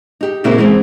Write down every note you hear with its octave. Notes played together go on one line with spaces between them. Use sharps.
D#4 G4
A#2 C#3 A#3 C4 E4 F#4
E3 G#3 B3 C4